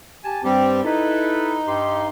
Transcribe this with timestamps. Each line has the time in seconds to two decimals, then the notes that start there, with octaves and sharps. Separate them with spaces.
0.24 G4 G#5 A5
0.44 G2 G3 C4 G4
0.84 D#4 E4 A4 B4
1.67 G2 G4 C6